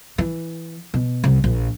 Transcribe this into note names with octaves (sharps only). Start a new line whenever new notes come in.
E3
B2
C2
A#1